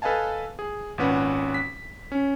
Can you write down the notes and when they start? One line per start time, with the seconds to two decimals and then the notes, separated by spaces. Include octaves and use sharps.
0.02 A4 B4 D#5 F5 G#5 A5
0.59 G#4
0.98 G#1 A#2 C#4 B4 F#5
1.54 B6
2.12 C#4